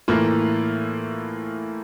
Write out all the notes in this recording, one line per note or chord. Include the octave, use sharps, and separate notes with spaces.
A2 E3 A#3 F4